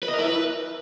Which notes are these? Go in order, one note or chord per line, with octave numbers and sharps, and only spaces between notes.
B4
D#5
A#4
E4
B4